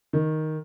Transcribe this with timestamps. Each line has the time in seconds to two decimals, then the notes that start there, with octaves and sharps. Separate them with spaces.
0.13 D#3